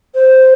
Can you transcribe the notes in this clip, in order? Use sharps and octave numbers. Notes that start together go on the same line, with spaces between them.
C5